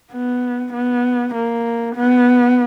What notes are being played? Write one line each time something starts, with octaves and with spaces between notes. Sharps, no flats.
B3
B3
A#3
B3